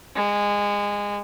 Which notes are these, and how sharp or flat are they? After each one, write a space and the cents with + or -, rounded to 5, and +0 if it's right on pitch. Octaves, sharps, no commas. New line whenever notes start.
G#3 -20